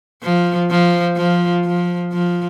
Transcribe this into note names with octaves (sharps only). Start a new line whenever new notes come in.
F3
F3
F3
F3
F3